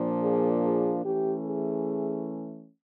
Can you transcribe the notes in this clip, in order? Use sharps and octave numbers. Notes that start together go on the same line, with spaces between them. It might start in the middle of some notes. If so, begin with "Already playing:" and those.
Already playing: A#2 F3 A#3 D4
G#4
G#4
E3 A3 C#4 G4
G#4